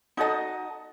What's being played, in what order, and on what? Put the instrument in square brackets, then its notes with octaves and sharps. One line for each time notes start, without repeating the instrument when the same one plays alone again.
[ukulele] D#4 F#4 A4 D#5